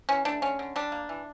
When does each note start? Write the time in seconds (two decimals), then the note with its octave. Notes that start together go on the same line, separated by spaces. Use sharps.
0.09 E3 C#4
0.25 A3 D4
0.42 D3 C#4
0.59 D3
0.76 G3 D4
0.92 A#3
1.09 E3